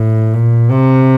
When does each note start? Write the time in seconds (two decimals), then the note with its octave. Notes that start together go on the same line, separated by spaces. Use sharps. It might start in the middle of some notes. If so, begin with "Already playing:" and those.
Already playing: A2
0.33 A#2
0.70 C3